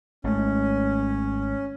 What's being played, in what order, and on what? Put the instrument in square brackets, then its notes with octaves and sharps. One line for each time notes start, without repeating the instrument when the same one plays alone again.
[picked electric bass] G#1 G#3 A3 [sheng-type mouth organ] C#4